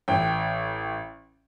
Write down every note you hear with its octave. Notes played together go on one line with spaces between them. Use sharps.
A1 G5